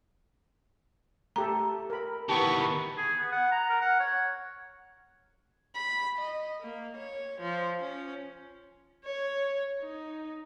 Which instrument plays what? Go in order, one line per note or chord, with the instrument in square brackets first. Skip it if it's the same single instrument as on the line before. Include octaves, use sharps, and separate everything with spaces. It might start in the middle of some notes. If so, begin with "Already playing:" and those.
[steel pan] A3 G4 A4 [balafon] A#5
[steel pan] A#4 B5
[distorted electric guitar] D#3 E3 [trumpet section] B3 C#6 [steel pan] G4 [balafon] A5
[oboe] G#4
B3
F#5
A#5
A#4
F#5
C#5
[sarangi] B5
D#5
A#3
C#5
F3
C#4
[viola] C#5
D#4